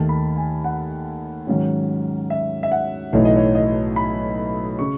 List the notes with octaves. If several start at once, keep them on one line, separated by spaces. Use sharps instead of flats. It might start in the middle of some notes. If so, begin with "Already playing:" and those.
Already playing: D#2 D#3 A3 A5
B5
G#5
F#5
G#2 D#3 F#3 C#4
E5
E5
F#5
B1 A2 E3 A3 D#4 C#5
D#5
C#5
D#5
B5
C#3 C#6